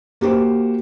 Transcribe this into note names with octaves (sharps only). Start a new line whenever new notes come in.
A#3 F#4 G4 C5